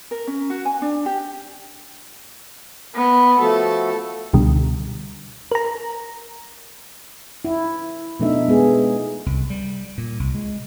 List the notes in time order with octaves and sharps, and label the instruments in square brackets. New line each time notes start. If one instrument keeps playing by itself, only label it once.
[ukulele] A#4
C#4
F#4
G#5
D4
G4
[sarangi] B3
[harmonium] F3 A3 F#4 [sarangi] A4
[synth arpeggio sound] C#2 B2 D3 G3
A#4 A#5
[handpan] E4
B2 F3 A3 D4 D#4 E5
G#3 B3 G#4
[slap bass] C2
G3
A#2
C2
G#3